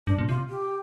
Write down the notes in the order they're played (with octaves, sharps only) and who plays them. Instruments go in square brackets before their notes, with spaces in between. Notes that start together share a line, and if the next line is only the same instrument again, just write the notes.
[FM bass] G2 [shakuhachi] D4
[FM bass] A#2
[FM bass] C3 [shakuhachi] F4
[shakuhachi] G4